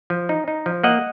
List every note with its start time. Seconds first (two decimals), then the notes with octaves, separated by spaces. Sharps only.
0.10 F3
0.29 D#4
0.48 D#4
0.66 F3
0.83 A#3 D#5 F#5